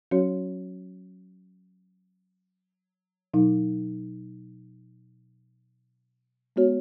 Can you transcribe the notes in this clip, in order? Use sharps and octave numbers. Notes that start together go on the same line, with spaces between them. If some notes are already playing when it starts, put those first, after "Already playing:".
F#3 C#4 F#4 C#5
B2 F#3 D#4
G#3 B3 F#4 C#5